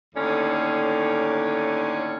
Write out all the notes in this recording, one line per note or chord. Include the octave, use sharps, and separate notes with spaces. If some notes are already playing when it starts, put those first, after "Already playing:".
D#2 A2 D3 C#4